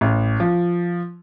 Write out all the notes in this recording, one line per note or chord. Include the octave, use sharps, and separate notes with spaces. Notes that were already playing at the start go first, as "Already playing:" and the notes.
A1
F3